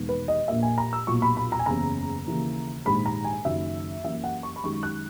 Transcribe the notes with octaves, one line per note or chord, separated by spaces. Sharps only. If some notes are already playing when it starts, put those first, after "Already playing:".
Already playing: E1 D#2 D#3 G#3 B3
B4
D#5
A#1 A#2 A#3 E5
G#5
A#5
E6
B1 A#2 F#3 C#6
B5
B5
A#5
G#5
F#1 E2 C#3 A#5
D#2 C#3 E3 A#3
A#1 G#2 D#3 G#3 B5
A#5
G#5
F#1 F#2 D#3 F#3 E5
F#2 E3 A#3 E5
F#5
C#6
B5
F#2 D#3 G#3 C#6
F#6